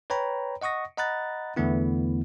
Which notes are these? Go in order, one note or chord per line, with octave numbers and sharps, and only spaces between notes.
B4 C#5 G5 A#5 B5
D#5 F#5 C#6 D#6 A#6
D#5 F#5 A#5 B5 F#6 A6
E2 D3 E3 A3 B3 E4